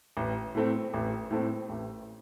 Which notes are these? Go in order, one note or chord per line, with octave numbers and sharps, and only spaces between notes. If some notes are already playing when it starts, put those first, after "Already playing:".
A1
A2 A3 C4
A1
A2 A3 C4
A1